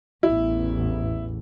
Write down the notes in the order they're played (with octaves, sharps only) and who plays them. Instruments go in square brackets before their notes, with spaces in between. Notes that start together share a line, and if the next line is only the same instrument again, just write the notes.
[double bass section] A1 E2 [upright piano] E4